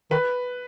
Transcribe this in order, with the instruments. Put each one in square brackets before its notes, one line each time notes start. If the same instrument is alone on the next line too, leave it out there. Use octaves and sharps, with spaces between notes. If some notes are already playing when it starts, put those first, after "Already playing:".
[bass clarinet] D#3 [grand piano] B4